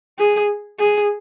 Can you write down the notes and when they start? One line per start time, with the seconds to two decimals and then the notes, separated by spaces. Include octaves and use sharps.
0.19 G#4
0.79 G#4